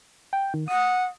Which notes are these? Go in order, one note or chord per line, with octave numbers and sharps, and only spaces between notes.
G5
D#3
F#5 D#6